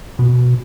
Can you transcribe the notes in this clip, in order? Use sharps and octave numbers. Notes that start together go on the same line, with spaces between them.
B2